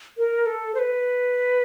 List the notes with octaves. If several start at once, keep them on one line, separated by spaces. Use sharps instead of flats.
A#4
A4
C5
B4